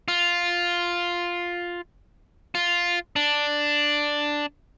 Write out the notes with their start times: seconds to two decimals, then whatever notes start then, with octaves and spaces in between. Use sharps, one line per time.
0.08 F4
2.55 F4
3.16 D4